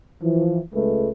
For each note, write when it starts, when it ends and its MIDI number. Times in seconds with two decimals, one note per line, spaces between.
0.22 0.59 52
0.22 0.59 53
0.73 1.08 37
0.73 1.08 56
0.73 1.08 57
0.73 1.08 71